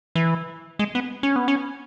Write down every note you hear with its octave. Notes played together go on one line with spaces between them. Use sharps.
E3
G#3
B3
C#4
B3
C#4